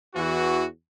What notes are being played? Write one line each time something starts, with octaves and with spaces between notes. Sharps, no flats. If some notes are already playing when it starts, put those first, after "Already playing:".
E2 E3 F#4